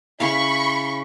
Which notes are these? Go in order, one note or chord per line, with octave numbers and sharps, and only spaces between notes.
C#3 E4 F5 B5 C#6